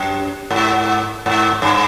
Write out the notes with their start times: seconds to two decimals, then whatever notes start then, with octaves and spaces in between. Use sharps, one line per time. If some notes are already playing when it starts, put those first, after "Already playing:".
Already playing: F#2
0.51 G#2
1.26 G#2
1.62 G2